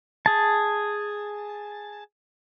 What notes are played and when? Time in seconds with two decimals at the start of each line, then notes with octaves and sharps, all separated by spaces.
0.26 G#4 A5